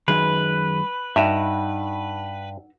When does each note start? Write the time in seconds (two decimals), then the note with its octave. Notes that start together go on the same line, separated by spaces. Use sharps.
0.08 F#2 D#3 G#3 B4
1.16 G2 D#4 F#4 E5